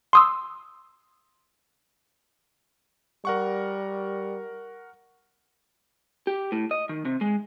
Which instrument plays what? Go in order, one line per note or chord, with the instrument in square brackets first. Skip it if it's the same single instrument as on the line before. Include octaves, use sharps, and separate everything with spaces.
[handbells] C6 D#6 E6
[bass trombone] G3 [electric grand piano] A#4 F#5 C#6
[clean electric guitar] G4
A2
D#5
D#3
C3
G#3